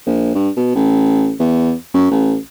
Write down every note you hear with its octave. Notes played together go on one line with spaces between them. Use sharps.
A#1
G2
B2
A1
E2
F#2
A1